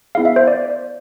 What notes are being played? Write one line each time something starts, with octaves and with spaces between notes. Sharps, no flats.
B3 E4 G#4 F5
E5
C5
D5